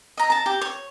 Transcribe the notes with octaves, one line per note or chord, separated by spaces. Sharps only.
D#5 A#5
A5 A#5
G4
C#5